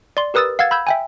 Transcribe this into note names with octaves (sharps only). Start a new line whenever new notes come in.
D5 C6
G4 A#4 B4 D#6 E6 A6
F5 F#5 E6 G#6 A6
B5 E6 G6 G#6
E5 G5 G#5